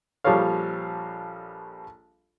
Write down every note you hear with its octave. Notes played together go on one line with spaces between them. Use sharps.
A#1 F3 G3 A4 C#5 F5